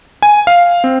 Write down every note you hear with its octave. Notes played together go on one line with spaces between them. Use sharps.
G#5
F5
C4